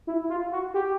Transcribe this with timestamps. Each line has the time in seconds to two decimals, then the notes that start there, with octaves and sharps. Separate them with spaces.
0.07 E4
0.29 F4
0.52 F#4
0.74 G4